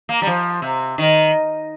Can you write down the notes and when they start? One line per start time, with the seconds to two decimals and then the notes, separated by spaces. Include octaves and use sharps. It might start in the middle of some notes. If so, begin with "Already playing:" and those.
0.09 A#3
0.22 G3
0.27 F3
0.62 C3
0.98 D#3